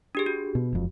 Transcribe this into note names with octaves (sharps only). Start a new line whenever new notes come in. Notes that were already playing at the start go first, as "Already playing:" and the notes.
D4 G4 G#4
F#4
B2
E1 F2